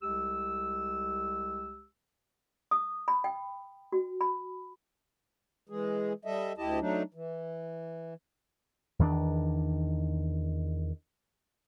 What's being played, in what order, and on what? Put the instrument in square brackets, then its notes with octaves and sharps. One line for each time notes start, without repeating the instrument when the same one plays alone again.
[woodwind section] C2 G#3 G4 E6
[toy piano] D#6
B5
G5
F#4
B5
[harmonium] E3 G#3 G#4
G3 A4 D#5 E5
D2 E4 G4 D#5 A5
F#3 A3 D4 D#4
E3
[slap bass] E2 D#3 A3 D4